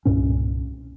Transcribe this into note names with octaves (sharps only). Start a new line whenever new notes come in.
C2 G2 A#2 C#4